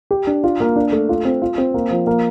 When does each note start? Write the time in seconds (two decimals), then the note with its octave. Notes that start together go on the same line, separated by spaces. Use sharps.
0.11 G4
0.27 D4
0.44 F4
0.60 A#3
0.76 D4
0.92 A3
1.09 F4
1.25 C4
1.42 F4
1.58 C4
1.74 A#3
1.90 F3
2.07 A#3